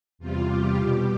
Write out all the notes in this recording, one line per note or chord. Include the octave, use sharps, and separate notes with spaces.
E2 C3 G3 F4
G4
B2 G3